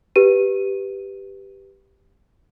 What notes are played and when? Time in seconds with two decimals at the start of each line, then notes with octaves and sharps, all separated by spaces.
0.16 G4 B4 D#7